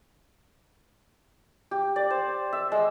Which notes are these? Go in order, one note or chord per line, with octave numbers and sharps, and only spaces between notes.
G4
D5
C5
E5
G#3